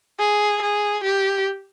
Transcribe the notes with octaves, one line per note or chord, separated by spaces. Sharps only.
G#4
G#4
G4